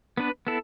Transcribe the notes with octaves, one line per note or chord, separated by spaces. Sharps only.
B3 D4 B4
B3 E4 A4